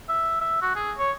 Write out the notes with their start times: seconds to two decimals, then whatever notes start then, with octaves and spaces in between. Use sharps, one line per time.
0.09 E5
0.41 E5
0.62 F#4
0.76 G#4
0.98 C#5